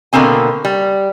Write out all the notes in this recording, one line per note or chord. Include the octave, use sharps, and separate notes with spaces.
B2 D3 A#3 C4 G#5
G3